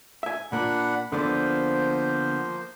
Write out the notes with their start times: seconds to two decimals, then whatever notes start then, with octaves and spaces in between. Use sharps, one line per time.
0.23 E5 G#5
0.52 A#2 A#3 D4 F#5 B5
1.12 D3 F3 A#3 B3 C5 D5